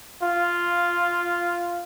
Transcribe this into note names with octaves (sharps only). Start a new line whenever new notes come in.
F4